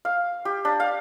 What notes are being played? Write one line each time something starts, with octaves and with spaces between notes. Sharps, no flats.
F5
G4
D4
F5